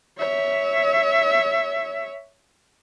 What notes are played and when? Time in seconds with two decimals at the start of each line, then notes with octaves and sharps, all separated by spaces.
0.18 C#5 E5